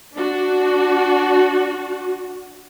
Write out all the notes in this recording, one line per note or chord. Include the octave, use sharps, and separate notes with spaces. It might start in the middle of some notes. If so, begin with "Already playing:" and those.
D4 F#4